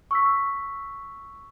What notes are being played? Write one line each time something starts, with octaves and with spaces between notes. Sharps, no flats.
C#6 E6 B6